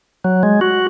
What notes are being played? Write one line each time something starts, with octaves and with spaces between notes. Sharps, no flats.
F#3
G#3
F#4